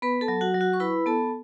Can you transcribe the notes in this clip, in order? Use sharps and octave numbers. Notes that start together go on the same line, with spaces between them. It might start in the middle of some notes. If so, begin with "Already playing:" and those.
B3 B4 B5
A4 A5
F#3
F#4 F#5
F#3
F#4 F#5
C#6
E4 B4 B5
B3 A4 A5